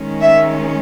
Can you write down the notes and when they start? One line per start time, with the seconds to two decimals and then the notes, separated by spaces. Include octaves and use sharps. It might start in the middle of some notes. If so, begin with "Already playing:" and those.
Already playing: D#3 G#3 C#4
0.21 E5